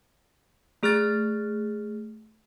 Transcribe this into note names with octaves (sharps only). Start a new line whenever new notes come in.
A3 G#4 F6 F#6 A6